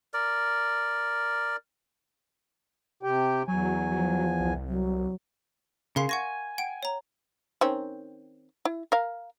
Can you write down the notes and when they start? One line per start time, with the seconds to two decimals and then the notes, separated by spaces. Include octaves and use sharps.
0.14 A#4 D5
3.03 C3 G4 G5
3.48 E2 F#3 G#5
3.91 F3 F#3
4.40 C2
4.67 F#3
5.96 C#3 A#4 F5 C6
6.09 F#5 G#5 C#6 A#6
6.58 F#5 G5 D7
6.83 C#5 A#5
7.61 D#3 C4 C#4
8.65 E4
8.92 A#4 F5